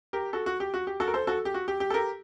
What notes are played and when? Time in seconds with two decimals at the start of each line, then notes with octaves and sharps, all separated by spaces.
0.13 G4 A#4
0.33 F#4 A4
0.46 F#4
0.60 G4
0.74 F#4
0.87 G4
1.00 F#4 A4
1.07 A#4
1.14 A4 C5
1.27 F#4 A4
1.45 G4
1.54 F#4
1.68 G4
1.80 G4
1.90 A4
1.94 G4 A#4